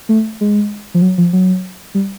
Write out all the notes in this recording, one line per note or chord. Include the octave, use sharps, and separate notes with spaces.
A3
G#3
F3
F#3
F3
F#3
G3